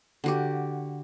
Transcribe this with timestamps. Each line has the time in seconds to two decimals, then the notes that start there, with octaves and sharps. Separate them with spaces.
0.24 D3 F#4 G4